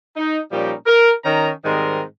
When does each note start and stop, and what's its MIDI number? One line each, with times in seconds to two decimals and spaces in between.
0.16 0.38 63
0.52 0.73 46
0.52 0.73 53
0.52 0.73 55
0.52 0.73 61
0.52 0.73 63
0.52 0.73 67
0.86 1.12 70
1.24 1.50 51
1.24 1.50 61
1.24 1.50 82
1.65 2.01 44
1.65 2.01 51
1.65 2.01 55
1.65 2.01 60
1.65 2.01 70
1.65 2.01 75